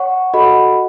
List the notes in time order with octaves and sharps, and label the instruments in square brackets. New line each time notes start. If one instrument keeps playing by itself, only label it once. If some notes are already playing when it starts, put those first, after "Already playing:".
Already playing: [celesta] C#5 F#5 C#6
F#4 A4 D#5 F#5 B5